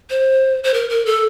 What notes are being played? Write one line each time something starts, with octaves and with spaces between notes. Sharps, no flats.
C5
C5
A#4
A#4
A4